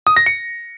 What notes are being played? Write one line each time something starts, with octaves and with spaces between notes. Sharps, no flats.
D#6
A#6
C#7